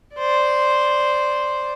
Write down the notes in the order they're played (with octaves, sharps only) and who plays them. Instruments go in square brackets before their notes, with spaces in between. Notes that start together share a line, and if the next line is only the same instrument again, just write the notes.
[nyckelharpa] C5 D5